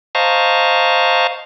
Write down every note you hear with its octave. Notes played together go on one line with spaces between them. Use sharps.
C5 D#5 F5 A5 A#5 C#6